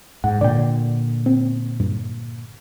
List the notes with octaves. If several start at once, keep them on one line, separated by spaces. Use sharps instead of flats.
G#2 F#5
A#2 D3 D5 G5
C4
G2